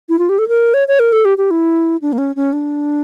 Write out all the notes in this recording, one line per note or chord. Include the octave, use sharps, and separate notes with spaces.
E4
F4
G4
A4
A#4
C#5
C#5
A#4
A4
G4
G4
E4
D4
A#3
C#4
C#4
D4